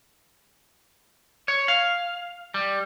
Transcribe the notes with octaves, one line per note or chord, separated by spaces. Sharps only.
C#5
F5
G3